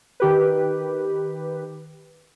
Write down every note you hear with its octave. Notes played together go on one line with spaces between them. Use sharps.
D#3 G4 B4